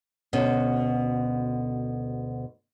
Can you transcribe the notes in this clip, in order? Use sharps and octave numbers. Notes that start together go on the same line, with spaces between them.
D2 B2 C#4